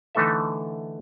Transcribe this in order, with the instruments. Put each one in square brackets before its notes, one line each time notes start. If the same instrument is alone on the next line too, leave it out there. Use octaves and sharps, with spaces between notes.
[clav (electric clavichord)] D3 E3 A3 D#4 A4 E5